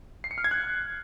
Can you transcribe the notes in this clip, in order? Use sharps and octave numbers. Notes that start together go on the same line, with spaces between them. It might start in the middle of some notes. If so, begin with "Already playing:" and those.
C7
C#7
F6
G#6
F#6